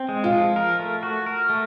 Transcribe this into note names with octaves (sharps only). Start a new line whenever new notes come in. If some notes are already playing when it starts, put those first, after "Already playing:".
Already playing: C4
G#3
F4
F3
A#4
A3
F#4
A#4
A3